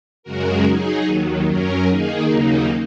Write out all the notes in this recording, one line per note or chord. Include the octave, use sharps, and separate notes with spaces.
F#2 C#3 G#3 F#4 A#4
F#3 D#4 G#4
D#2 D#3 F#3
F#2 F#3 C#4 A#4
D#3 A#3 D#4 G#4
D#2 C#3 F#3 A#3 D#4